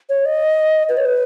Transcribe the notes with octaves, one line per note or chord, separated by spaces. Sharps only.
C#5
D#5
B4
C#5
B4